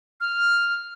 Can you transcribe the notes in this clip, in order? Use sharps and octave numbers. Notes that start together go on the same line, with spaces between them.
F6